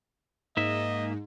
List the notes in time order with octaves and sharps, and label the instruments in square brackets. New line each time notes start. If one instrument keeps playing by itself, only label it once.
[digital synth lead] G#2 [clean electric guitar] A#3 E5 [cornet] D#5